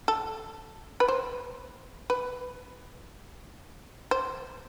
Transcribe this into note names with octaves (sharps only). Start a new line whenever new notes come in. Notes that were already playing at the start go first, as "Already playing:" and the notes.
A4
B4
C5
B4
C5